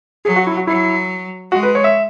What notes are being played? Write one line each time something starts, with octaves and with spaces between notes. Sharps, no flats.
F#3 G#4
F#4
E4
F#4
F#3 E4
G#3 F#4
B4
C#5
E5